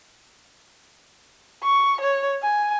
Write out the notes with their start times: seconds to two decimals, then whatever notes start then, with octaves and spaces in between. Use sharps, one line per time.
1.63 C#6
2.01 C#5
2.42 G#5